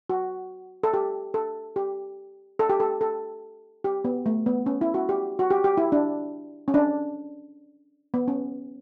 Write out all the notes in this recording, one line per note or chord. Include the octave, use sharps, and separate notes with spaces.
F#4
A4
G4
A4
G4
A4
G4
A4
A4
G4
B3
A3
B3
C#4
E4
F#4
G4
F#4
G4
G4
E4
D4
C#4
D4
B3
C#4